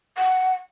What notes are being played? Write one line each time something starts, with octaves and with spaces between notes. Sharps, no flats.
F#5